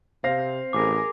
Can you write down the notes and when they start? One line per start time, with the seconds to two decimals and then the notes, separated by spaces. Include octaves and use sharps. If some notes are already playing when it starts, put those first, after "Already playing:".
0.24 C3 C4 F5 A#6
0.73 A1 G#4 A#4 D6